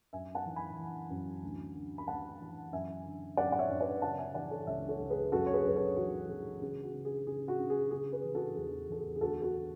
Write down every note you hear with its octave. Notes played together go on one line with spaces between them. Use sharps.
F#2 E5 G#5
F#5 A5
E3
G#5 B5
E3
F#2
D2
D2
B5
D2 F#5 A5
E3
F#2 E5 G#5
D3
F#2 D5 F#5
F#5
C#5 E5
F#2
B4 D5
C#3 F#5 A5
E5 G#5
E3 D5 F#5
A4 C#5
C#2 C#5 E5
A4 C#5
C#2
G#4 B4
F#2 F#4 A4
C#5
G#4 B4
F#2 B4
A4 C#5
E3 F#4
E3 G#4
C#3 G#4
F#4
C#3
G#4
C#3 G#4
F#4
C#3
G#4
C#3 G#4
G#4 B4
E3
F#4 A4
E2 G#4
E2 A4
G#4
G#4
D2 F#4 A4
F#4 A4